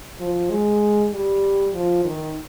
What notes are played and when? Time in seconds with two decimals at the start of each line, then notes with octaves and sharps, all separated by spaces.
0.20 F3
0.50 G#3
1.12 G3
1.74 F3
2.05 D#3